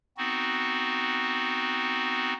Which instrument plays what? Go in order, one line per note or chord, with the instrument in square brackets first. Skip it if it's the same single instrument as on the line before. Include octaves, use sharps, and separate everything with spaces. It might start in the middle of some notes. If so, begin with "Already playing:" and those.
[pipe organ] B3 C4 D#4 F#4